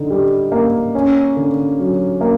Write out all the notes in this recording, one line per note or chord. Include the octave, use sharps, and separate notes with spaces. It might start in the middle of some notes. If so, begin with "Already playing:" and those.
Already playing: D3 D#4
G3
A#3
C#4
D3
F#3
A#3